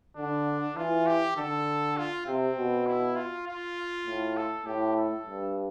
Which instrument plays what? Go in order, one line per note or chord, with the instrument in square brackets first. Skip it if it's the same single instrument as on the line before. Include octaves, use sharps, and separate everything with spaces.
[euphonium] D3 [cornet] D4
[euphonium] E3 [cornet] F4
[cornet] G4
[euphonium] D3 [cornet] A4
[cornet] F4
[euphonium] C3 [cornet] C4
[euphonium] B2
[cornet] E4
F4
F4
[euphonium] A2
[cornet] A4
[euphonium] A2 [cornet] G4
[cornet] A4
[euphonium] G2